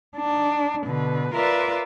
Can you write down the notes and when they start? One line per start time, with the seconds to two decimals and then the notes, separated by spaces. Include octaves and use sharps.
0.17 D4 D#4
0.86 B2 D3 B4
1.34 F4 A#4 B4 D5 E5